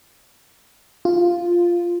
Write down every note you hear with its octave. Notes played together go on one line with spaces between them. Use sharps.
F4